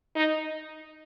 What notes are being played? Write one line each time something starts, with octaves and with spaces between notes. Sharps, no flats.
D#4